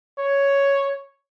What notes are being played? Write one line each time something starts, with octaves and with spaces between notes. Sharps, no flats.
C#5